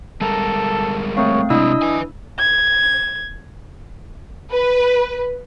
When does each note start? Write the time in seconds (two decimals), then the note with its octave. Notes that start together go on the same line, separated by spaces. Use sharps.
0.21 G3 G#3 A4 A#4
1.17 A3 C4 C#5 F5
1.50 C3 G#3 C4 D4 E4 D#5 E6
1.82 B4 G#5
2.39 G#6
4.52 B4